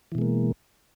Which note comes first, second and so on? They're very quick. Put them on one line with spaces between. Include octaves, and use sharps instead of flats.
E3 B2 G#3 A#3